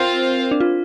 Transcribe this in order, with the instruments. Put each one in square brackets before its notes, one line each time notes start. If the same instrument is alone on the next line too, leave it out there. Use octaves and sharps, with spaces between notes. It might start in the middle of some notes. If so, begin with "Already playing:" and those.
Already playing: [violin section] C4 F4 C5 F5 [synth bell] A#4
[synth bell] D4
F4